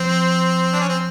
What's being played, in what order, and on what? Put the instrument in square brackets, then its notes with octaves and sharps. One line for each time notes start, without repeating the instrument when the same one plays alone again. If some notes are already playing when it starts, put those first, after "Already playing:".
Already playing: [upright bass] F3 [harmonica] C4
[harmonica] D4
C#4
C4